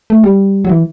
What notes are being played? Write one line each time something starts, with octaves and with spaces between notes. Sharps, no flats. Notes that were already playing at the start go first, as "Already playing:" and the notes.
A3
G3
F#3
E3